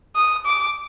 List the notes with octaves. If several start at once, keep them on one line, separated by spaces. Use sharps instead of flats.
D#6
D6